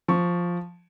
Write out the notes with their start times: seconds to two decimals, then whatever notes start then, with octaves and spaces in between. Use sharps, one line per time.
0.08 F3 C#6